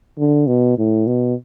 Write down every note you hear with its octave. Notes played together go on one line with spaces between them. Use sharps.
D3
B2
A2
B2